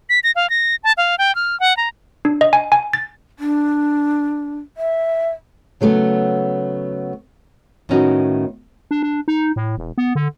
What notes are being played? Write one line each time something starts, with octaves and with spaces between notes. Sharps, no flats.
B6
A#6
F5
A#6
A5
F5
G5
F6
F#5
A#5
D4
D#5
G#5
G#5
A6
D4
E5
C#3 F#3 A3 B3
A2 D#3 B3 C#4 D#4 F#4
D4
D4
D#4
A2
E1
B3
D3